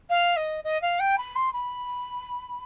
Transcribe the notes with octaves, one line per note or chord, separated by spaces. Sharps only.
F5
D#5
D#5
F5
G5
B5
C6
B5